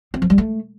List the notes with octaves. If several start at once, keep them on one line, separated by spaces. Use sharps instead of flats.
C4
F3
G3
A3